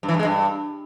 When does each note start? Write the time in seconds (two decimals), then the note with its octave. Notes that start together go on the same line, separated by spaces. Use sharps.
0.03 G2
0.09 E3
0.14 G2
0.19 G#3
0.25 G2